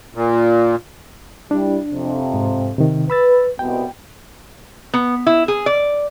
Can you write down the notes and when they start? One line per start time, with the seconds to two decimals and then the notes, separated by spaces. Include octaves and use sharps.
0.15 A#2
1.51 G3 D4 E4
1.91 F2 C3
2.34 G#2
2.78 C3 D#3
3.10 B4 B5 E6 A6
3.59 C2 B2 G5
4.94 B3
5.27 E4
5.48 G#4
5.66 D5